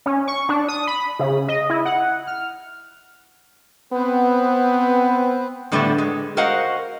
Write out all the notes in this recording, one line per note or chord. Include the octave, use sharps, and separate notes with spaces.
C#4
C#6
D4
D#6
B5
C#3
D#5
E4
F#5
F6
B3 C4 B4 C5
A2 D3 G3 A3 B3
G#3
F#4 A#4 C5 D#5 F5 F#5